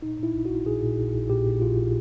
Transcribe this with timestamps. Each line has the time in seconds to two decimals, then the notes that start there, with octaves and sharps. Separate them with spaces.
0.02 A#2 D#4
0.19 A#2 E4
0.34 A#1
0.45 A#1 F#4
0.66 A#2 G#4
0.82 A#2
0.98 A#1
1.14 A#1
1.30 A#2 G4
1.46 A#2
1.62 A#1 F4